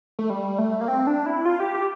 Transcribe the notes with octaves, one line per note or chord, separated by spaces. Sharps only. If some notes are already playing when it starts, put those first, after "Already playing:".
A3
G3
A3
A#3
C4
D4
E4
F4
G4
G4